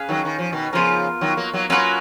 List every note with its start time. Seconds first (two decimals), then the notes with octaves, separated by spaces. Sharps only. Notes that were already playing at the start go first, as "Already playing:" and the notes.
Already playing: C#4 G#4 B4 F5
0.09 D#3 F#3
0.25 D#3
0.39 F3
0.52 B2 D#3
0.73 C#3 F3 B3 F4 A#4
1.21 D#3 F#3
1.37 F#3 A#3
1.54 F#3 A#3
1.69 F#3 A#3 C#4 F4 B4 F#5